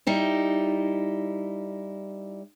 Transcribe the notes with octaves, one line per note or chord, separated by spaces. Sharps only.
G3 D#4 E4